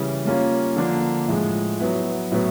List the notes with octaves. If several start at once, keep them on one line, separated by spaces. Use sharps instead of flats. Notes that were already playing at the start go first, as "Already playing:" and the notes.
Already playing: C#3 E3 G3
G3 A#3 C#4 F4
D3 F3 A#3 D4
A2 F3 G#3
F#3 B3 E4
A2 F#3 B3 E4